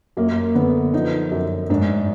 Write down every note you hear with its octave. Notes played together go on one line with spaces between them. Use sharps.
F#2 A#3
D3 B3
F3 D#4
F#2
G#2 D4